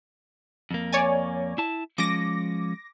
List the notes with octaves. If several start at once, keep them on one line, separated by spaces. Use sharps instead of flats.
F2 A#3
C#5 D5 G#5
E4 A5
F3 G#3 C#4 D6 A#6